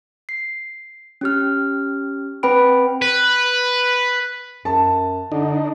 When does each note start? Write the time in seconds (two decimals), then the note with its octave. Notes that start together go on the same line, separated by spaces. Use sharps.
0.29 C7
1.21 C#4 G4 F6
2.43 C4 B4 G5 B5 D7
3.02 B4
4.65 F#2 A5
5.32 D3 D4 D#4